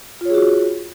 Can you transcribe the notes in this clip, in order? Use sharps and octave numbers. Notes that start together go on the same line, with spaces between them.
F4 F#4 G#4 C#5